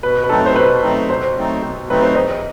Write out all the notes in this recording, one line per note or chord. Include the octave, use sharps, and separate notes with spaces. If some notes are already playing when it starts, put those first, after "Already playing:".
B2 B4
B4
F#3 A3 C4 D#4 A4
C5
B2 B4
F#3 A3 C4 D#4
B2 C5
F#3 A3 C4 D#4
B2
F#3 A3 C4 D#4 B4
C5
E2 D#5